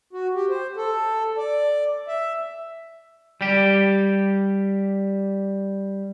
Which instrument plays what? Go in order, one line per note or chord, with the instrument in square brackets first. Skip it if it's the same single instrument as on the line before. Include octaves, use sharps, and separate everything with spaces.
[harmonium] F#4
G4
C5
A4
D5
E5
[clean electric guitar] G3 G4